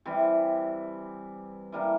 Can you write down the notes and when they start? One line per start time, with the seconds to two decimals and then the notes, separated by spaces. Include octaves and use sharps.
0.05 C3 E3 G3
1.72 E3 G3 A#3 D4